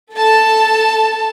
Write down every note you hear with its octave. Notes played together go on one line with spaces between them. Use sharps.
A4 A5